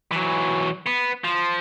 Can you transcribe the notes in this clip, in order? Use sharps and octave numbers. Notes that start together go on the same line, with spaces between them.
E3 F#3
B3
F3